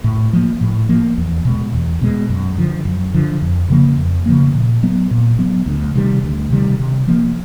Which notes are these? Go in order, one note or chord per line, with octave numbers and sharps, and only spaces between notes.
A2
F3 A#3
A2
F3 A#3
E2
B2 G#3
E2
B2 G#3
F#2
D3 F3
F#2
D3 F3
F2
C#3 F3 A#3
F2
C#3 F3 A#3
A#2
F#3 B3
A#2
F#3 B3
D2
C3 D#3 G3
D2
C3 D#3 G3
C3
F3 A#3